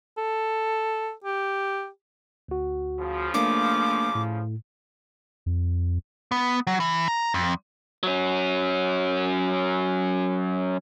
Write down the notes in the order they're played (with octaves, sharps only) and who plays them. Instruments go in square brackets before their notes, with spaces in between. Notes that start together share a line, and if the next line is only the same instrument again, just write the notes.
[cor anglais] A4
G4
[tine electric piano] D2 F#4
[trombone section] C#3 F3
[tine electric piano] A3 A#3 D4 [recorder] D6
[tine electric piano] A2
[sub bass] F2
[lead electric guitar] B3
F#3
E3
A#5
F2
F#3 C#4